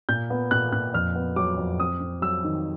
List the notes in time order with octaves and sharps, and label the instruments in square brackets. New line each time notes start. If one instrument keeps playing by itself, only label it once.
[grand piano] A#2 G6
B3
A#2 F#6
A#2 F#6
F2 F6
B3
F#3 D6
F2
C4 D#6
C4
F#3 E6
D#3